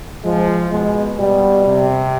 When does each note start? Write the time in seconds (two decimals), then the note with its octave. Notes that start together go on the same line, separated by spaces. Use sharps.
0.24 F3 G#3
0.72 B2 G#3
1.19 B2 G3
1.66 C3